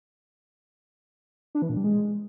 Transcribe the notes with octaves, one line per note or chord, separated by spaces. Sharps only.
D4
E3
A#2
G3
G#3